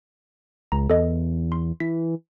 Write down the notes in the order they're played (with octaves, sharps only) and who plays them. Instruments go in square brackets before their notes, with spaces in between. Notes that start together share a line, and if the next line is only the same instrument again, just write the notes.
[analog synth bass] C#2 [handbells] A#5
[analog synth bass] E2 [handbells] A4 D#5
[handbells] C6
[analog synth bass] E3 [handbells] B6